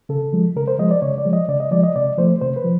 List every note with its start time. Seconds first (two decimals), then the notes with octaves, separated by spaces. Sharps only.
0.09 C#3 A4
0.33 F3 G#3
0.56 C#3 A#4
0.68 C5
0.79 F3 G#3 D#5
0.91 D5
1.02 C#3 C#5
1.18 D5
1.25 F3 G#3
1.33 D#5
1.48 C#3 D5
1.60 D#5
1.71 F3 G#3 D5
1.84 D#5
1.96 C3 D5
2.18 F3 A3 C5
2.41 C3 C5
2.56 B4
2.64 F3